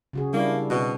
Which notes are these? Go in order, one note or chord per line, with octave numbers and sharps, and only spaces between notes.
C#3 F#4 G#4
G3 A#3 D4 E4
B2 C4